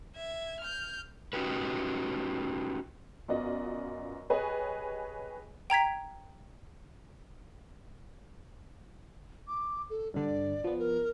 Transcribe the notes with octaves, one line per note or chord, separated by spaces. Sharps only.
E5 G#6
F6 G6
C#4 D#4 F#4 G4 B4
F#2 B3 F4 D5 D#5
G4 G#4 B4 C#5 D#5 G#5
G5 A#5 G#6 B6
D6
A4
G2 D3 D5
F3 B3
A#4